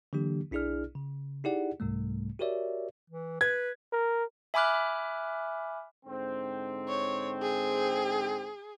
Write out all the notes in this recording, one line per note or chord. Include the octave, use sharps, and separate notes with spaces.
D3 E3 F#3 A#3 D4 G4
B1 D4 E4 G#4 D5 F6
C#3
D#4 E4 G4 G#4 D5 F#5
C2 G#2 C3 G3 A3
F#4 G4 A#4 C#5 D5 E5
E3
B4 G#6
A#4
E5 G#5 B5 D6 F6 F#6
G#2 D3 C4
C#5
G#4